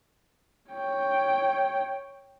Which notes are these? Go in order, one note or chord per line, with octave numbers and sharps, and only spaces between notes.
C#5 G5